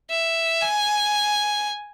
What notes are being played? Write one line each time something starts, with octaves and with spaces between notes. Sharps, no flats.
E5
G#5